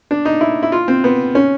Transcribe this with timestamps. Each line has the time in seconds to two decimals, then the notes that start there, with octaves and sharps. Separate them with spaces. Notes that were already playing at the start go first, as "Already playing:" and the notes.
0.11 D4
0.25 D#4
0.41 E4
0.63 E4
0.72 F4
0.88 C4
1.04 B3
1.35 C#4